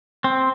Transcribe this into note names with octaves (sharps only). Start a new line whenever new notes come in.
C4